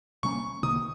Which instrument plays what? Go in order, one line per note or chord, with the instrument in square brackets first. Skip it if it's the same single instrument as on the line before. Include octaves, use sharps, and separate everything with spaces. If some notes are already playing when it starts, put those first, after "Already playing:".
[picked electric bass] C3 G3 A#3 C#4 [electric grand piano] C#6
[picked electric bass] C2 C3 D#3 A#3 [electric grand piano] D#6